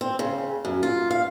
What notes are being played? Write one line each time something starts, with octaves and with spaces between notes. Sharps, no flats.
C4
C#3
F#2
F4
F5